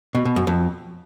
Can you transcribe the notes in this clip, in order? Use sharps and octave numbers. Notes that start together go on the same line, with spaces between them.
B2
B2
F#2
F2